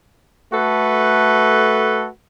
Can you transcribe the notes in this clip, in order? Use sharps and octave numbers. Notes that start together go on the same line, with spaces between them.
A3 F#4 A4 B4